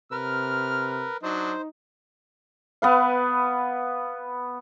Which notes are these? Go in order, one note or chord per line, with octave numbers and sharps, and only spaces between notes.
C3 A#4 B4 F6
F#3 D4 D#4 C5 D#5
B3 B4 F5